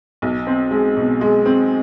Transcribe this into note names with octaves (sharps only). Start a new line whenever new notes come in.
B1
C4
G#3
B2
G#3
C4